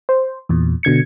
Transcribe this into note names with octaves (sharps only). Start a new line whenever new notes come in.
C5
E2 A#2
B2 D3 G#6 C#7